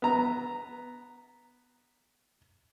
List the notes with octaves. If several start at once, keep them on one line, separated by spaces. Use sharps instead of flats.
B3 A#5